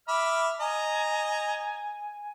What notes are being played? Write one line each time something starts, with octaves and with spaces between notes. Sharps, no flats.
E5 B5 D6 F6
D#5 G#5 A#5